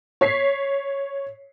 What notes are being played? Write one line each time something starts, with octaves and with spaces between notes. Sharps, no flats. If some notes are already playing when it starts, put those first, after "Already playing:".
C#5 B6 C7